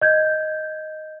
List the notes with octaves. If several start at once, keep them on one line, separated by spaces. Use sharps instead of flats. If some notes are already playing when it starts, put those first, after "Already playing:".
D#5 G6 G#6